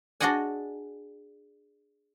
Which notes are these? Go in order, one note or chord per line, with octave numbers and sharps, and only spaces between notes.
D4 F#4 G#4 D#5 F#5 G#5